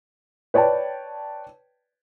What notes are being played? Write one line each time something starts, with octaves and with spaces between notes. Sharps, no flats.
B4 C#5 D5 G5 A5